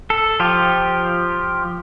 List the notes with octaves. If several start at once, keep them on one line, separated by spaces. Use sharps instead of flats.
A4
F3 F4 G4